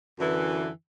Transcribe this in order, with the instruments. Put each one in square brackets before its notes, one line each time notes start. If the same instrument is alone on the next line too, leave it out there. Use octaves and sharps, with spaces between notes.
[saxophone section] F#2 D3 E3